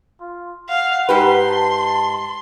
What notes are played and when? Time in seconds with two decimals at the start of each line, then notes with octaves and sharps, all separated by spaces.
0.21 F4
0.69 F5 F#5
1.09 G#2 G4 B4 C6
1.47 A5